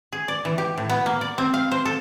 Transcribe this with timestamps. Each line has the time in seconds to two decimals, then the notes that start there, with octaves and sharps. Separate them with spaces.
0.13 G#4
0.28 D5
0.45 E3
0.58 G4
0.78 A2
0.90 B3
1.06 A#3
1.21 D5
1.38 C4
1.54 F5
1.71 C5
1.85 A4